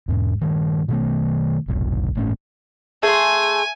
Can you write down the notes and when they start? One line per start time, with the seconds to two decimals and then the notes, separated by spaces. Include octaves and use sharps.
0.08 E2 G#2
0.41 G2 D#3
0.88 B2 D#3 A3
1.68 F1 B1
2.15 G1 A2 C#4
3.03 A3 G#4 G#5 C6